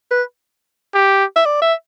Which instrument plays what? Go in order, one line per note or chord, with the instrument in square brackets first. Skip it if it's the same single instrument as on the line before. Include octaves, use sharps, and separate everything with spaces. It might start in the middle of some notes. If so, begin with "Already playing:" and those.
[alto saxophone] B4
[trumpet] G4
[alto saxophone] E5
D5
E5